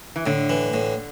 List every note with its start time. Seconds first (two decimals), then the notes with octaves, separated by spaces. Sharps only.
0.16 E3
0.26 A2 D3
0.50 E3
0.74 A2